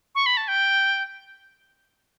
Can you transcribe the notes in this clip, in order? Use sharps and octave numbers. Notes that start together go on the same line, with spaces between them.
C#6
B5
A5
G5